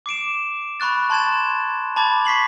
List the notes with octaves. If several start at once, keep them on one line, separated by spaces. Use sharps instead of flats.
D6 C7 D7 E7
B5 C#6 F#6 A6
A5 C6 G#6 A6 E7
A5 B5 D6 G#6 A6
C#6 B6 C7 F#7